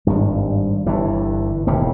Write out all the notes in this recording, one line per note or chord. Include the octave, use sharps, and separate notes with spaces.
G#1 G2 G3
G1 G2 E3
E1 D#2 C#3 E3